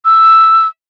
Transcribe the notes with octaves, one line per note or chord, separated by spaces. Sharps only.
E6